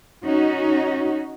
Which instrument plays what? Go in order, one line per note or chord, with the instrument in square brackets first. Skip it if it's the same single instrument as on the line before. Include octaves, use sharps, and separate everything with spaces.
[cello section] C#4 D#4 F#4